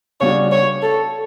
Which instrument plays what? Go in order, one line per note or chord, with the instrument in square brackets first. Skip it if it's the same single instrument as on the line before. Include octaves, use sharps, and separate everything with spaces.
[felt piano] C#3 G3 D4 F#4 [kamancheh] C#5
[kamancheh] C#5
A4